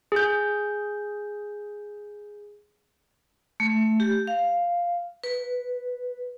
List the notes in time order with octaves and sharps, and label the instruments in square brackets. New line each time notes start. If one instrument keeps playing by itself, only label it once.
[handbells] G#4 G6
[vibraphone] A3
G4
F5
B4